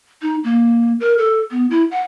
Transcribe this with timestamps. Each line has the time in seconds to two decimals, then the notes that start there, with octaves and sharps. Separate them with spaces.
0.22 D#4
0.44 A#3
1.00 A#4
1.18 A4
1.51 B3
1.70 E4
1.91 F#5